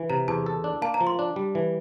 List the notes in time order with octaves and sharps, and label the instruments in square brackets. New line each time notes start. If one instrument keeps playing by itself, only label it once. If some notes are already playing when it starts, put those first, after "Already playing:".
Already playing: [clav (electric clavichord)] E3
[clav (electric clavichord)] C3 [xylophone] A#5
[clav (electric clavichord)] E2 [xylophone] A5
[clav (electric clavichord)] A4
D4
[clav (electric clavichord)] A#3 [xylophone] A5
[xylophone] A#5
[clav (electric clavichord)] F3
[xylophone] C6
[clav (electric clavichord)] D4
G3
E3